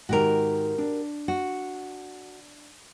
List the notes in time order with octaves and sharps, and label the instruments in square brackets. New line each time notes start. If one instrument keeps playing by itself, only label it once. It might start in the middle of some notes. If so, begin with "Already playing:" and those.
[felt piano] G#2 D#3 [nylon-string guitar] F#4 G4 A#4
[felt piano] D4
[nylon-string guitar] F#4